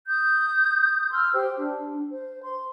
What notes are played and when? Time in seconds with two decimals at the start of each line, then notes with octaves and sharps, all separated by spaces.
0.08 D#6 G6
1.12 C6 E6 F6
1.34 G4 C5 G5
1.57 D4
2.11 C5
2.40 C6